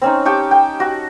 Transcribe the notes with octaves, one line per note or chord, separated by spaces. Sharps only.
C4 C#4 D#4
G4 G5 A5 C#6
G5
F#4